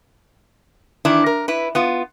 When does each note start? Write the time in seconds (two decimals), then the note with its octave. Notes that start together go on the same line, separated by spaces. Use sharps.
1.05 D#3 E3 D4 E4
1.26 A#4
1.48 E4 B4
1.75 B3 F4